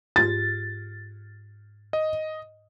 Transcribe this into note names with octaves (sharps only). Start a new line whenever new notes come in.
G#2 F4 G4 A6
D#5